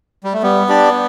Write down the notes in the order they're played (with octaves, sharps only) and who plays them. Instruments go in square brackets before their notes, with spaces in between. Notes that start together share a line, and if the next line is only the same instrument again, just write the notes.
[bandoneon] G3
A3
[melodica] G3 [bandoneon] B3
[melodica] D4 G4 D5